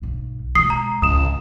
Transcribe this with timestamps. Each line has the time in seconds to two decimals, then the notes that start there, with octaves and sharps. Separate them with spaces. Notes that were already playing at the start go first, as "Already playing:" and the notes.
0.02 B1 G2
0.55 B2 G#3 D#6 C7
0.70 A#5
1.02 G#1 C#2 G#2 D#6 E7